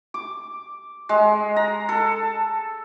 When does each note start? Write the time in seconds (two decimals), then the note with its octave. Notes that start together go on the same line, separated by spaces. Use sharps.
0.14 D6
1.09 G#3
1.56 A#5
1.89 A4